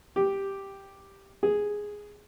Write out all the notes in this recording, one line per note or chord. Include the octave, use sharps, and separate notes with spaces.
G4
G#4